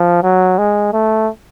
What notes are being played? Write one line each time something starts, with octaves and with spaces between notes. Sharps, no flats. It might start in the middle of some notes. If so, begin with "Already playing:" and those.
Already playing: F3
F#3
G#3
A3